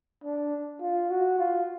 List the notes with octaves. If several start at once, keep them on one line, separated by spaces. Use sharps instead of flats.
D4
F4
F#4
F4